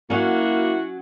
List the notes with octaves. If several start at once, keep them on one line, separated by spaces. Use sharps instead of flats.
F#3 A#3 C#4 E4 F#4